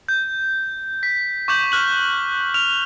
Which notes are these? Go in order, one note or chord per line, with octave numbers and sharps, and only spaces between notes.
G6
B6
C#6 D6 G6 F#7
F6 F#6 F#7
F6 F7